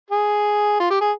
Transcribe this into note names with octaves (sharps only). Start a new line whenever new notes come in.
G#4
F4
G4
G#4